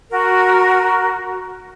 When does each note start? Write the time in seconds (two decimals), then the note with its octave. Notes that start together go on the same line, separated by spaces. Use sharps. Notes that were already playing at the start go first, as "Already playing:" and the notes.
0.10 F#4 A#4